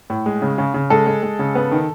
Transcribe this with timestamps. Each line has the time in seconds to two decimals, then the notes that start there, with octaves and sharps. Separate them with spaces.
0.10 A2
0.26 G#3
0.42 C#3
0.58 C#3
0.74 C#3
0.90 G#3 A4
1.07 G#3
1.23 G#3
1.39 C#3
1.55 B3
1.72 D#3